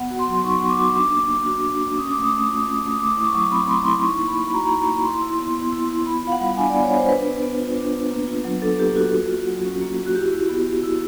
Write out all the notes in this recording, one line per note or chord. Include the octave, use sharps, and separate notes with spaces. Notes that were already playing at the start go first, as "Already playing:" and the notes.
Already playing: B3 F#5
F#4
C6
F#3
D#4 C#6
B3
D6
F#4
D4 D6
A#3
A#3
F#4
D4
A#3
C#4 D#6
A3 D6
D#6
A3
F4
C#4
A3
D#6
A3 D6
E4 D6
C#6
F#3
C4 B5
A3 C6
E4 C6
D#4 C#6
A#3
B5
A#3
F#4 A#5
D#4
A#3
E4 C6
E4
B3
B3
E4
E4
B3 B5
F4 F5
F#5
G3
D4 G#5
B3 D5
C#5
F4 C5
D4 B4
B3
B3
F4
D4
B3
A#3
F4
F#3
D4 A4
A#3 G4
F4 F#4
A#3
F4
F#3
C#4
A#3
F4
F#4
E4 G4
E4
B3
B3
E4